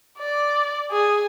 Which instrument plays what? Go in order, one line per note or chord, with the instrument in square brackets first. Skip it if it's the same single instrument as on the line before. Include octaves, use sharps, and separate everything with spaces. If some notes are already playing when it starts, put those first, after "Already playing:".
[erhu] D5
G#4